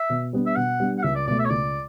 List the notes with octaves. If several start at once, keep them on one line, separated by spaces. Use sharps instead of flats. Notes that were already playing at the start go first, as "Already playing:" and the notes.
Already playing: E5
B2
G3 B3 D4
E5
B2 F#5
G3 B3 D4
F#5
C#2 E5
D5
B2 A3 D5
E5
C#5
C#2 D5